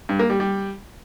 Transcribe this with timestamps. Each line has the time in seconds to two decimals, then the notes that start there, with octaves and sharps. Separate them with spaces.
0.09 G2
0.19 A#3
0.30 G3
0.40 G3